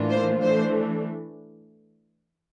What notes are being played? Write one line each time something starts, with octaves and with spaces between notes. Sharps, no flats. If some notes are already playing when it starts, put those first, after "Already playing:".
Already playing: A2 E3 A#3 D4 F4
C5
E3 A3 D4 C5